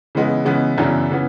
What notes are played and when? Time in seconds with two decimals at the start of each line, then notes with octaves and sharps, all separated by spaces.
0.15 C#3 E3 G#3 B3
0.45 C#3 E3 G#3 B3
0.77 F#2 C#3 E3 B3 D4
1.11 C#3 E3 B3